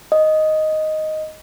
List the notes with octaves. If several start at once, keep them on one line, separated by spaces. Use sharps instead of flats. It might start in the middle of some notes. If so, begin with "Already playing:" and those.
D#5